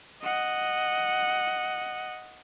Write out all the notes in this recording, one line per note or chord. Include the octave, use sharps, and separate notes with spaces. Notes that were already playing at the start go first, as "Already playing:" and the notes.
D#5 F#5